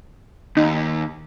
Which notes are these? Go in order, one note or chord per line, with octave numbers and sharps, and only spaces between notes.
D#2 D#4